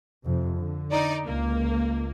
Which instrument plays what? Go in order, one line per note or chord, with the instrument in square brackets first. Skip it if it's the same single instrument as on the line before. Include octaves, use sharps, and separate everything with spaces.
[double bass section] F2 C3
D3
[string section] D#4 D5
[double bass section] C#2 [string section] A#3